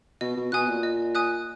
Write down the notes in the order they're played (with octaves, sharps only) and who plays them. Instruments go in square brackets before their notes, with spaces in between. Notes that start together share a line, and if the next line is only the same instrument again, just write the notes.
[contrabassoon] B2 [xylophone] D#5
[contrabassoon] B2
[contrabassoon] B2 [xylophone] G#5 D#6 F#6
[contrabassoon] A#2
[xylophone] D#5
G#5 D#6 F#6